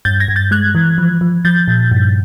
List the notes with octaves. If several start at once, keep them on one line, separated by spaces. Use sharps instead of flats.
G2 G6 A6
G#6 A#6
G2
G6 A6
G#3 F#6 G#6
E3
F3
F3
F3 G6 A6
A#2
G2